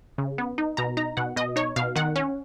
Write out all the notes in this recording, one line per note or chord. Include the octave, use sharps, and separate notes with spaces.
C#3
B3
D#4
B2 A#5
D#4 A#5
B2 F#5
B2 D#5
D#4 C#5
B2 F5
D#3 F#5
C#4